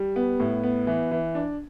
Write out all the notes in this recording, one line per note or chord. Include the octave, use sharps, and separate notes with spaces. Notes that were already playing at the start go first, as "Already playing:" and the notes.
Already playing: G3
B3
A2
B3
E3
E3
D4